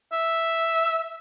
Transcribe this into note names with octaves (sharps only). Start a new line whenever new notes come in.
E5